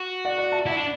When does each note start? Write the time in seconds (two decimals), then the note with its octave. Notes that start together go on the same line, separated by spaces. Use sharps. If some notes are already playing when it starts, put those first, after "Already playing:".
Already playing: F#4
0.25 D5 F#5
0.38 D5 F#5
0.52 E5 A5
0.66 E4 D5 F#5
0.76 D4